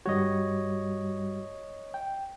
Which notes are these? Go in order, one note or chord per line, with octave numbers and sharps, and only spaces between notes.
G2 G3 F#4 C#5 D#5
G5